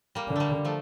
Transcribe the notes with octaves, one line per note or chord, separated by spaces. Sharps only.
G3 A#3
D3
G3 A3 A#3
F3 A3